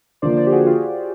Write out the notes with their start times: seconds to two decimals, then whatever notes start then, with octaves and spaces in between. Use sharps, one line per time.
0.22 D3 F3 A#3 C5 D5
0.37 C5 D5
0.46 G4
0.52 F#4 G#4
0.66 F4 G4